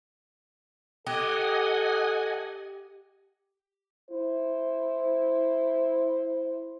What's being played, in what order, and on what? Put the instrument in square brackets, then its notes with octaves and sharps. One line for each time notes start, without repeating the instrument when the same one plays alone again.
[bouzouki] G4 [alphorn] A4 [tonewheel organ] D#5 F#5 G#5
[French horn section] E4 C5